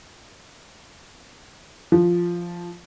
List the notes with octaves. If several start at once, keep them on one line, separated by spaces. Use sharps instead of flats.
F3